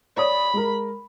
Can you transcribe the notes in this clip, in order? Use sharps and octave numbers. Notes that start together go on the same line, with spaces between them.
C#5 D5 B5 D#6
G#3 A#4